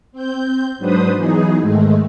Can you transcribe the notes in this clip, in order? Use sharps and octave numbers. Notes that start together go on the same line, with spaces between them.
C4 G6
G#2 F#3 D4 B4 C5 D#6
E3 F#3 B3 D#4 G#4
G#2 D#3 G#3 A3